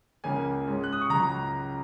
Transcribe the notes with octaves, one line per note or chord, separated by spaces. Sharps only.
C#2 C#3 A#3 C#4 G#5
G#2 G#3 C#4
F#6
D#6
C#6
C#2 C#3 F#3 A#5